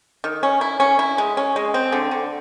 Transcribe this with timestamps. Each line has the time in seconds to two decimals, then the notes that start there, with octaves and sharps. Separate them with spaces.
0.24 D#3
0.43 C#4
0.61 E4
0.80 C#4
0.99 E4
1.18 G#3
1.37 C#4
1.56 G#3
1.74 C4
1.92 D3
2.11 D3